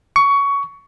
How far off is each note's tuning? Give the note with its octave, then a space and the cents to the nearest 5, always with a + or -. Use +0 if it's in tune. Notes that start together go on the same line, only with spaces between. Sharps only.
C#6 +20